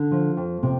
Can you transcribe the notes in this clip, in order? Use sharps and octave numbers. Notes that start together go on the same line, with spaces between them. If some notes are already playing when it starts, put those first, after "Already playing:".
Already playing: D3
F3
F2
C3